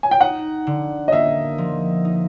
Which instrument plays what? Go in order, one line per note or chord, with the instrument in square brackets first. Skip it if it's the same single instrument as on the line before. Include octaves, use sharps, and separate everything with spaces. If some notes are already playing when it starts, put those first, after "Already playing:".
[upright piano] G#5
G5
[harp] D#4 [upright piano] F#5
[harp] D3
[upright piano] D#5
[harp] A#3 [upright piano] E5
[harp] F3
D#4